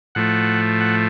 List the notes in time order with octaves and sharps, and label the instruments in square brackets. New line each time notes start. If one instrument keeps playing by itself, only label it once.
[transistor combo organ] A2 F3 A3 F#5
F#5